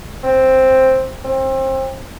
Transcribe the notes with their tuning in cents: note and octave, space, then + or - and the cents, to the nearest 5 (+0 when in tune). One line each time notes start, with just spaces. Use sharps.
C4 +5
C4 +30